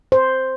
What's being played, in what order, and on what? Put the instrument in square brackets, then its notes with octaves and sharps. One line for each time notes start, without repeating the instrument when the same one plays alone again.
[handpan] C5